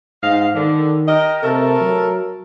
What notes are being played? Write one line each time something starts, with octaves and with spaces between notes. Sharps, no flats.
G#2 D#5 F5
D3 D#3
G4 A#4 D#5
C3 A3 A4 A#4
F#3